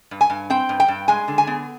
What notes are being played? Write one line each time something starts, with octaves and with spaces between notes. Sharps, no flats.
G2
G#5
G2
C4 G5
G2
G5
G2
G#3 G#5
D3
G#5
B3